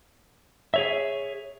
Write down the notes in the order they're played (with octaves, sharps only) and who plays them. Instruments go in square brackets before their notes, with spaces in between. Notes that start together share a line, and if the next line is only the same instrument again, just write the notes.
[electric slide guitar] G#4 C#5 E5